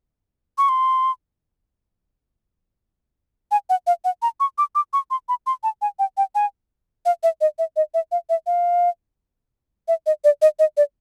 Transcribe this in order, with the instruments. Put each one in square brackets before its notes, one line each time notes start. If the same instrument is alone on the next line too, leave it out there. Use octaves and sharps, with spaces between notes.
[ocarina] C#6
C6
G#5
F#5
F5
F#5
A#5
C#6
D6
D6
C#6
C6
B5
C6
A5
G#5
G5
G5
G#5
F5
E5
D#5
E5
D#5
E5
F5
E5
F5
E5
D#5
D5
D#5
D#5
D5